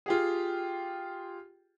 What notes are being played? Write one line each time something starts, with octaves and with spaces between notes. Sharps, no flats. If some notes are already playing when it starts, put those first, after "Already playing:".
F4 G4 G#4